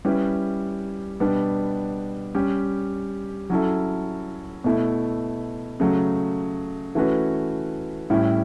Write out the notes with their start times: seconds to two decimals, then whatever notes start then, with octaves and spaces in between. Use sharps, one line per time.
0.05 G3 C#4 E4 G4 B4
1.20 B2 G3 B3 D4
2.35 G3 C#4 G4
3.50 F#3 C#4 E4 A4
4.64 B2 A3 E4
5.80 C#3 F#3 A3
6.95 E3 A3 C#4 F#4 B4
8.10 A2 G3 C#4 E4